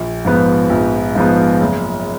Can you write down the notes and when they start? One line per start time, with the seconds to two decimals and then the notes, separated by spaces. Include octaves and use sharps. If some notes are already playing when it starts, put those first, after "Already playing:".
Already playing: A#1
0.25 G#2 F3 B3
0.70 A#1
1.15 G#2 F3 B3
1.60 F#1